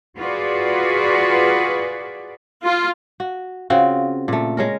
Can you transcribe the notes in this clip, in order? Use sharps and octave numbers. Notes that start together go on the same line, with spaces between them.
F4 F#4 G#4 B4 D5
F4
F#4
C#3 C4 F4 F#4
A#2 A3
G#3 C#4 A#4